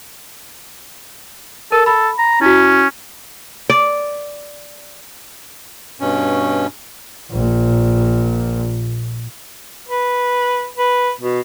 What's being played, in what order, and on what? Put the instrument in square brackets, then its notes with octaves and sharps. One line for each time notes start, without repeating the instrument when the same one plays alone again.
[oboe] A4 [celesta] A#4
[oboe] A4 [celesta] B5
[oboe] A#5
[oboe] C#4 [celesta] E4 F#4
[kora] D5
[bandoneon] G2 B2 C#4
[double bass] A#1 A#2
[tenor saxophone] B4
B4
B2